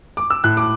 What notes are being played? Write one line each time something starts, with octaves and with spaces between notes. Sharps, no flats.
D6
E6
A2 F#6
D6